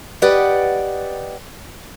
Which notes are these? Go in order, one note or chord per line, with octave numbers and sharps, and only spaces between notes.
G4 B4 D5 D#5 F#5 G5